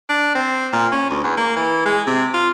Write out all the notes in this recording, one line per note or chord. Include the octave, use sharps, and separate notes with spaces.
D4
C4
A#2
C#4
D2
E2
A#3
E3
G#3
C3
F4